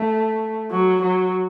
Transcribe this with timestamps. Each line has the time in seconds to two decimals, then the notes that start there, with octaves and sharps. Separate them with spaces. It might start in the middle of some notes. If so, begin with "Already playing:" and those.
Already playing: A3
0.71 F#3
1.02 F#3